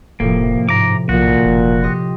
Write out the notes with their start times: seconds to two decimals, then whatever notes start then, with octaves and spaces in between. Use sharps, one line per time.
0.20 E1 A2 C3 F3 A#3
0.69 G#2 A#5 D6
1.09 B1 A#2 F3 F#4
1.45 F#1
1.82 G4 D#5 C6